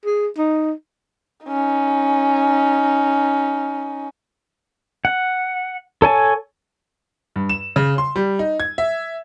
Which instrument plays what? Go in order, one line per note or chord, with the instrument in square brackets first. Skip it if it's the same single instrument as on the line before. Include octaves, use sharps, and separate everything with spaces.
[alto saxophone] G#4
D#4
[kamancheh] C#4 D#4
[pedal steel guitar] F#5
A4 C#5 G#5 A5
[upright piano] G2
E7
C#3
C6
G3
D#4
G#6
E5